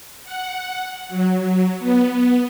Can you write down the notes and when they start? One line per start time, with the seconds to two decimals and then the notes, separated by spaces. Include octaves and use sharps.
0.24 F#5
1.09 F#3
1.79 B3